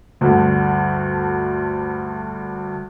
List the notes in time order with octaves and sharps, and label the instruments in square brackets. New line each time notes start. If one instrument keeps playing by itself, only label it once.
[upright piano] D2 G2 D3